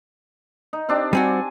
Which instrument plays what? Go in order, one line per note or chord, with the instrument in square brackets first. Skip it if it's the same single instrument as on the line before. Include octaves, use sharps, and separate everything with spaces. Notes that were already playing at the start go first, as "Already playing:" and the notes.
[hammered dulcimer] D#4
C4 D4 G4
[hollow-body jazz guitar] G3 C4 F#4 [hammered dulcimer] G#5